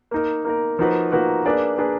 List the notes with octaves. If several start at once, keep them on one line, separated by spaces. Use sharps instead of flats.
A#3 D#4 A#4
A#3 D#4 A#4
F3 A#3 D#4 F#4 B4
F3 A#3 D#4 F#4 B4
A#3 D4 G#4 B4 D5
A#3 D4 G#4 B4 D5